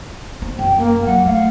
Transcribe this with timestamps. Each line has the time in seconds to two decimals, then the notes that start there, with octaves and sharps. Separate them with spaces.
0.42 C4
0.59 F#2 G5
0.77 A#3
1.06 F#3 F#5
1.26 A3 F5